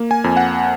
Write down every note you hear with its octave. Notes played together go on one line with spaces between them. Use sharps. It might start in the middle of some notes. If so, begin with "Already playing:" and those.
Already playing: A#3
G#5
F2
F#5